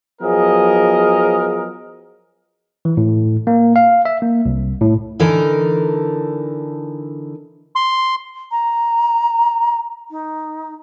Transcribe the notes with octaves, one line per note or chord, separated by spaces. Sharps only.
F3 F#3 B3 G#4 A#4 D#5
E3
A2
A#3
F5
E5
A#3
C2
A2
D3 E3 D#4 A4 A#4
C6
A#5
D#4